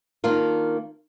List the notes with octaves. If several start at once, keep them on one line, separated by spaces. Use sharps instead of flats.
D#3 A#3 D4 F4 A#4